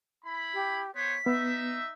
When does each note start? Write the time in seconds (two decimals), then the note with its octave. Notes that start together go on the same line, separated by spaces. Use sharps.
0.24 E4 B5
0.54 G4
0.95 B3 C5 C#5 B6
1.26 B3 D#4 E5